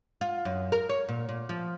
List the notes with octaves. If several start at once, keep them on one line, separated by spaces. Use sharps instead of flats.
F4
F#2
A#4
C#5
A#2
A#2
F3